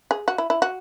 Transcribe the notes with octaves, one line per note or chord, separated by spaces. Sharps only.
G#4
F#4
E4
E4
F#4